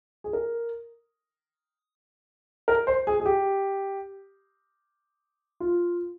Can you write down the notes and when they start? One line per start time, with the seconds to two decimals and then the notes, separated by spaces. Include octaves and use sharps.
0.24 G#4
0.33 A#4
2.68 A#4
2.87 C5
3.07 G#4
3.20 G#4
3.26 G4
5.60 F4